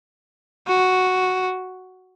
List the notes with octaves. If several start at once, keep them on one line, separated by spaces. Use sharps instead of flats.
F#4